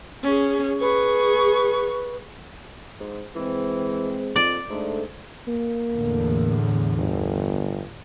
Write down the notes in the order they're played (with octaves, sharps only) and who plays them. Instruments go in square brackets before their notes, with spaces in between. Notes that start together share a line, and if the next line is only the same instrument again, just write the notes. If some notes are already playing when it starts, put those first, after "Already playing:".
[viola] C#4 G#4
[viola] G#4 C#6 [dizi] B4
[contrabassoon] G#2
[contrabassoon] E3 [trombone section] G#3 C4
[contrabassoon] F2 [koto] D5
[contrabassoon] G#2 [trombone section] A3 D4 A4
[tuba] A#3
[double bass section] E2 A2 D3
[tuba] G1